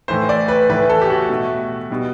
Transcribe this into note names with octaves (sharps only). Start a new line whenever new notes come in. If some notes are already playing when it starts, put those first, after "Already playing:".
A2 E3 A3 C5
D5
B4
A2 E3 A3 B4
A4
G4
F#4
B2 A3
B2 G3